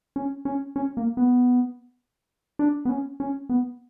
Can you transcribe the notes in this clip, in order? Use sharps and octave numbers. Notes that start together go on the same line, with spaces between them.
C#4
C#4
C#4
A#3
B3
D4
B3
C#4
C#4
B3